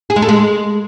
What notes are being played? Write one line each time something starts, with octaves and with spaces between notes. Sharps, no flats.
G#4
G#3
A4
G#3